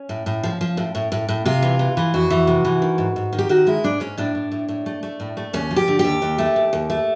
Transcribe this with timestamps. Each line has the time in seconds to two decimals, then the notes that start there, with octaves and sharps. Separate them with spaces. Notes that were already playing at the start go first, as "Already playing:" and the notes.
Already playing: C#4
0.09 A2
0.26 A2
0.44 F3
0.61 F3
0.77 A2
0.95 A2
1.12 A2
1.29 A2
1.46 C3 F4
1.62 E3
1.79 E3
1.97 E3
2.14 F2 F#4
2.30 E3
2.47 C3
2.65 E3
2.82 D#3
2.98 G#2
3.16 G#2
3.33 D#3
3.38 G4
3.49 D#3 F#4
3.67 G#3 E4
3.84 G#2 D4
4.00 G#2 C#4
4.18 A2 D4
4.35 A2
4.52 A2
4.68 A2
4.86 A3
5.03 A3
5.20 A2
5.37 A3
5.53 D#2 C#4
5.71 F3
5.76 G4
5.88 D3
5.99 G4
6.05 D#2
6.22 D#2
6.38 A3
6.56 D#2
6.73 D#2
6.90 A3